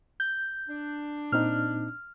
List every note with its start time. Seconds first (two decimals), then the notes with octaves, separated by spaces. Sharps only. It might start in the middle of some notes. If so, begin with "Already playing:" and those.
0.20 G6
0.69 D4
1.32 A#2 C4 D#4 F6